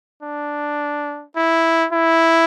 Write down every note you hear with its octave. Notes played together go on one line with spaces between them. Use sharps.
D4
E4
E4